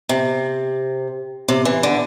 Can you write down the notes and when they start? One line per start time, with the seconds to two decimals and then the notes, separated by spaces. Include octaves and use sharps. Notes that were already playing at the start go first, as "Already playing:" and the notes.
0.09 C3
1.48 C3
1.65 E3
1.83 D3